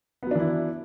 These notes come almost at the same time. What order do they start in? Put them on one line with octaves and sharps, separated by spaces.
B3 F#3 D4 E3 E4